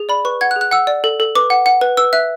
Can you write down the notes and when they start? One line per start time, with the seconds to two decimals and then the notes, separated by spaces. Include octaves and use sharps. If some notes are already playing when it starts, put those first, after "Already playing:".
Already playing: G#4
0.09 D5 B5
0.25 B4 C#6
0.41 F#5 G#6
0.51 F#6
0.56 G#4
0.61 F#6
0.71 F#5 E6
0.87 D5
1.04 A4
1.20 A4
1.35 B4 D6
1.50 F#5
1.66 F#5
1.81 B4
1.97 B4 E6
2.13 E5 F#6